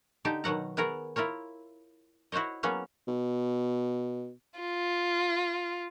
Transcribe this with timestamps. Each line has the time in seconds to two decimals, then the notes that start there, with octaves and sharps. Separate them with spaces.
0.25 D3 D#4 G4 A5
0.44 B2 D#3 F#3 F#5 A#5
0.77 B3 G#4 A#4 C#5
1.16 E4 F4 A#4 C#5
2.32 E4 F#4 C5 C#5 D#5
2.63 F#3 A#3 B3 C#4 G#4 C#5
3.08 B2
4.60 F4